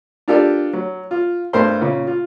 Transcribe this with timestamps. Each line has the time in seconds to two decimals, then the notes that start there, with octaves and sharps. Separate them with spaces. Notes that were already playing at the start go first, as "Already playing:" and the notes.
0.28 D4 F4 G4 A4 A#4 D5
0.73 F#3
1.11 F4
1.53 G2 A3 A#4 C5 C6
1.81 A#2 C#3
2.07 F4